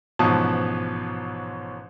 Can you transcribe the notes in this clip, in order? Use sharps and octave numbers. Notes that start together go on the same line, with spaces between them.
A1 G#2 B2 F3 A5 D#6